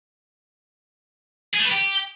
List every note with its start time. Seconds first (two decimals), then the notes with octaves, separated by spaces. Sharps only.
1.54 G#4
1.59 A3
1.65 B4
1.71 G4